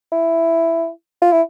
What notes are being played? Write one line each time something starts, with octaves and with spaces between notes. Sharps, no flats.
E4
F4
E4